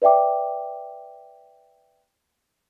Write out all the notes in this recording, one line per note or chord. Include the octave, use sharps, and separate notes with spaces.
B4 D5 E5 G5 D6